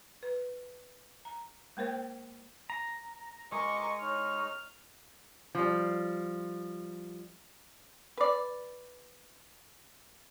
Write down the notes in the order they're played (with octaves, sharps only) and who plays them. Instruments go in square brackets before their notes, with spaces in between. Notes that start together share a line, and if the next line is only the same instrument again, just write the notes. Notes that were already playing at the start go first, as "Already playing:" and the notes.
[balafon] B4
A#5
G#3 A#3 A#4 C5 G5
[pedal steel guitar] A#5
[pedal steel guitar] G#3 [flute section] A#4 A#5 D6 [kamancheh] D#5 C#6
[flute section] D#4 C#5 C#6 [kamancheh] F6
[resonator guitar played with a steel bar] F3 G3
[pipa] B4 D5